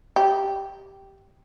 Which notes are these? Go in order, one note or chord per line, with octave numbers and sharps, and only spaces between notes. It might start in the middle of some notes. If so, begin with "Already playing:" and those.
G4